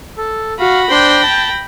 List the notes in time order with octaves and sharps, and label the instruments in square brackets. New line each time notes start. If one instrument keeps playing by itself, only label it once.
[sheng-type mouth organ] A4
[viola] F#4 [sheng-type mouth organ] F5 [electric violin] B5 A#6
[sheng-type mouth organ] D4 C5 C6 [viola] G5
[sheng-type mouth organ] A5